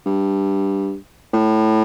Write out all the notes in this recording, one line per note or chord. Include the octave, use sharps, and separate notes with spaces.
G2
A2